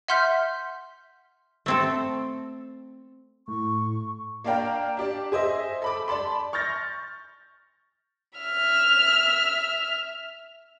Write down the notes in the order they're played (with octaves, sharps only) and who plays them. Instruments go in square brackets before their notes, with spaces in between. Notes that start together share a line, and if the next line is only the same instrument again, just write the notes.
[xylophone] E5 F#5 C6 F6 G6 B6
[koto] A3 C4 A4
[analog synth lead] A2 [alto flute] C#6
[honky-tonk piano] A#3 D4 D5 F5 G5 A#5
D4 G4 D5
G#4 C5 D#5 E5
A4 B5 D6
D5 A5 B5 C6
C#6 F6 G6 A6 A#6
[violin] E5 F6